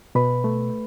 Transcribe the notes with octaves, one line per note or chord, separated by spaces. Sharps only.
B2 B4 B5
A3